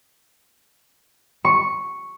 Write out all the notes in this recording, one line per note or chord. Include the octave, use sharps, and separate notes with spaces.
C#6